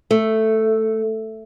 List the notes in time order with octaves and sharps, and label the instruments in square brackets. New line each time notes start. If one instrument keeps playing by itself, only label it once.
[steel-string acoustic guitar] A3